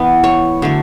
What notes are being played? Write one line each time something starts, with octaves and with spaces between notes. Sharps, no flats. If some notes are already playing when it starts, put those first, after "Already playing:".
Already playing: E3 B3
C#5
D3 F#3 A3